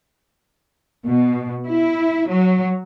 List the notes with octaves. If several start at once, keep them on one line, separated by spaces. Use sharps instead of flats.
B2
E4
F#3